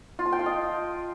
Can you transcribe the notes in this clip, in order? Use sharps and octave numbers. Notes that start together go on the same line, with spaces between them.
F4
A5
G5
F5
D#5